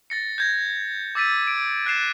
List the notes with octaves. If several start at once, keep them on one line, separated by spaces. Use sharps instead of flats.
A6 A#6 C#7
G6 G#6 A#6
D6 E6 A6 B6 D#7
D7
F#6 A6 C7 E7